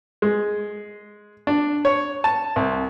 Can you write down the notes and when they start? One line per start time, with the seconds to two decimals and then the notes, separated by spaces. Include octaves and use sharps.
0.22 G#3
1.47 D4
1.85 C#5
2.24 A5
2.56 C2